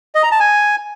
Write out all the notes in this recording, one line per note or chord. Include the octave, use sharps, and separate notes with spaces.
D#5
A#5
A5
G#5